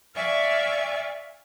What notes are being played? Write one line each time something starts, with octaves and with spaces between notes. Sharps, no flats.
D5 E5 F5 G#5 C#6